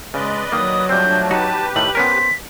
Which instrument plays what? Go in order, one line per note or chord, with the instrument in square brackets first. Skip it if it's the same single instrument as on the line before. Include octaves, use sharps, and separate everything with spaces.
[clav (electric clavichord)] C#3 [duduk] G#3 [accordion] B4 D5 D#5
[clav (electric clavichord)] D#3 A#3 [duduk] F#3 [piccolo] D#6
[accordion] F3 A3 D4 [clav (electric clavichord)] G3 C4 [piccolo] G6
[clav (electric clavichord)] D#4 F#4 [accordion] G4 B4 [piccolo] A5
[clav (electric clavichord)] A2 D#3 A3 [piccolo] F#7
[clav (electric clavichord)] B3 C#4 A#4 [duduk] C5 [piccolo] B6